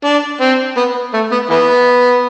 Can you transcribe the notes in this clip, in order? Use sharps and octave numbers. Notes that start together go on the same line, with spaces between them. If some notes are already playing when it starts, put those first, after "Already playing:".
D4
C4
B3
A3
B3
E3 B3